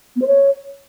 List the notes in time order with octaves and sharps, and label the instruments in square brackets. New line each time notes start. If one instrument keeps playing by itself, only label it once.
[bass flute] B3
C5
C#5